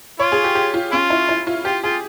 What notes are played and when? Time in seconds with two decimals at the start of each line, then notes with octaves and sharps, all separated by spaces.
0.19 F4 C#5
0.32 G#4
0.44 G4
0.55 G4
0.74 F4
0.92 C#4 F4
1.10 E4
1.29 E4
1.47 F4
1.65 F4 G4
1.83 F4 G#4